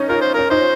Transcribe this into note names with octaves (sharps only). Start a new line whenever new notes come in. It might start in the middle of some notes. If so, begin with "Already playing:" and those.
Already playing: C#4 D#4
F4 A#4
C5
C#4 A#4
D#4 C5